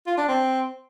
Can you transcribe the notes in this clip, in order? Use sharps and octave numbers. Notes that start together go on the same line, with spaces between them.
F4
D4
C4